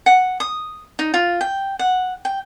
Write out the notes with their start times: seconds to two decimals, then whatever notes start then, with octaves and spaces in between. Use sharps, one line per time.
0.06 F#5
0.40 D#6
0.99 D#4
1.14 F4
1.41 G5
1.79 F#5
2.25 G5